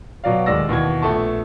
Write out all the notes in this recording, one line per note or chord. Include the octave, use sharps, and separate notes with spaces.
B2 F#3 D5 F5
D#1 D#2 G#3 D5 E6 A#6
D#2 B2 E3 G#6
A#1 A3 B3 A5 C#6